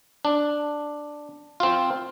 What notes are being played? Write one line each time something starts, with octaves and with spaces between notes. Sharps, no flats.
D4
C4 F4